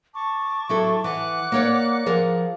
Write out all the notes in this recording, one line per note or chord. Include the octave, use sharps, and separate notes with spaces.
A5 C#6 D6
F#3 E4 A4
E3 F#5 D6 F#6
A#3 C#5 D5
F3 G#4 A#4